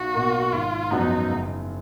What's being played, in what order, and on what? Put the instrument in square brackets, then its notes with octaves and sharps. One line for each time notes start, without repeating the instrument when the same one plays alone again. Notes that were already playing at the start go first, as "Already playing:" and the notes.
Already playing: [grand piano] B1 [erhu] F#4
[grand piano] B2 A#3
[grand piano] G#1 [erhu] F4
[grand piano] F#2 F3 B3 F#4 [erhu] D#4
[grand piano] F#1